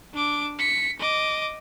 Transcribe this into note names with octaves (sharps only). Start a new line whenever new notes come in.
D4 D6
B6 C#7
D#5 D6